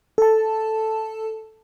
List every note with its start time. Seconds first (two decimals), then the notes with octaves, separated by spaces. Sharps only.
0.18 A4 A5